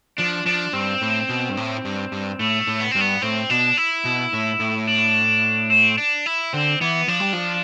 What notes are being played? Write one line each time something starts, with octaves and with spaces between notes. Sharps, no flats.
F3 D4
F3 D4
G2 C4
A2
B2
G2
A2
G2
G2
A2 A3
A2
B3
G2 C4
B3
A2 C4
B2 D4
E4
B2
A2
A2
D4
C4
D4
E4
D3 C4
E3 B3
F3 D4
G3
F3